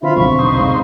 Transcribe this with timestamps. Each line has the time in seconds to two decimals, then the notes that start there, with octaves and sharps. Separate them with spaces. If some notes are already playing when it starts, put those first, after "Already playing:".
0.02 D3 F#3 C4 F4 E5 B5
0.16 B1 E2 B5 C#6
0.39 C3 D#4 C5
0.56 G#2 C4 F5